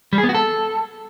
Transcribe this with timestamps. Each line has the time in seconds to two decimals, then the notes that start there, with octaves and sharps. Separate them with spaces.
0.13 G3
0.18 G#4
0.24 B3
0.29 F#4
0.34 A4